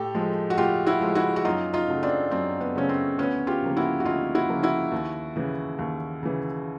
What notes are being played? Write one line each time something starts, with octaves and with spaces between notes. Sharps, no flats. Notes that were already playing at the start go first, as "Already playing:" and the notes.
Already playing: A2 G4 A4
F3 G#3
F#4
A2 F4 G4
E4 F#4
F3 G#3
E4 F#4
F#4
F#2 D#4 F4
D#4 F4
C#3 F#3 A3
C4 D4
F#2 C4
B3
C#3 F#3 A3 C#4
C4
D2 B3 C#4
F4 G4
C#3 F3 A#3
E4 F#4
F#4
D2 D#4 F4
E4 F#4
C#3 F3 A#3
E4 F#4
D#2
C#3 E3
D#2
C#3 E3